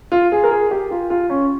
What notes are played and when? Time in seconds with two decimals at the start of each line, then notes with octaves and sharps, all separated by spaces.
0.12 F4
0.32 G#4
0.44 A#4
0.51 G#4
0.71 G4
0.91 F4
1.10 F4
1.30 C#4